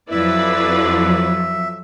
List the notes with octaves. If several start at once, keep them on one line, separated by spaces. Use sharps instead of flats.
F2 F3 F#3 E4 B4 D5 E5